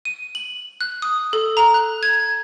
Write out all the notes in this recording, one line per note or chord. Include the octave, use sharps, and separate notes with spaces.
D#7
F#7
F#6
D#6
A4
A#5
F#6
G#6